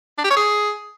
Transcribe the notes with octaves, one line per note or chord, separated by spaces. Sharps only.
D4
G4
C#5
G#4